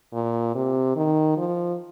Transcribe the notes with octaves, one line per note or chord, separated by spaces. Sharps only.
A#2
C3
D#3
F3